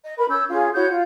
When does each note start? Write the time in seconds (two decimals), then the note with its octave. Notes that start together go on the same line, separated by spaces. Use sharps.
0.03 D#5
0.17 A#4 B4 B5
0.30 C#4 E6 G6
0.49 C#4 F4 G#4 F5
0.74 E4 F#4 C#5 G6
0.90 F4